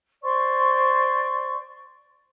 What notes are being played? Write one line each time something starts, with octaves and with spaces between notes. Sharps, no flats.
C5 D5 C6 C#6